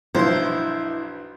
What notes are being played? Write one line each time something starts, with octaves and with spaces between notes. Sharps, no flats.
B1 G2 F3 E4 C5